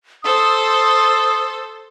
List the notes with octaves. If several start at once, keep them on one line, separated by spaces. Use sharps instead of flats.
A4 C5 D#6